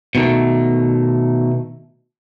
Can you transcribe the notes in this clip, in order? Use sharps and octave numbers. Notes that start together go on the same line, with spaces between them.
B2 D#3 A3